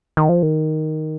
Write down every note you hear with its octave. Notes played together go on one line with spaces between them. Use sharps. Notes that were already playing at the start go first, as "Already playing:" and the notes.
D#3
F3
D#3